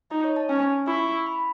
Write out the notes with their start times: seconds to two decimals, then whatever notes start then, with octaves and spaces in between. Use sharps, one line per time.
0.11 D#4 D#5
0.24 C#5
0.36 A5
0.49 C#4 G#5
0.87 E4 C#6
1.26 B5